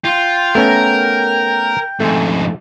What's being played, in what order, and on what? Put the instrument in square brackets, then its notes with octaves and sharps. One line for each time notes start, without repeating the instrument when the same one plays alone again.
[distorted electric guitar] F4 [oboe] G5
[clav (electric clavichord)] A3 B3 C#4 [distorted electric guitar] A#4
[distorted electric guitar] F2 G#2 [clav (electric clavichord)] A3 G#5